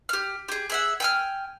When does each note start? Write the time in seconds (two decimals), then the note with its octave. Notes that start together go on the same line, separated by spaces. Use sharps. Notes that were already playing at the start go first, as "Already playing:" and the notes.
0.09 G4 F6
0.48 G4 G#4
0.70 G#4 E5 F#5
1.00 G5 G#5 F6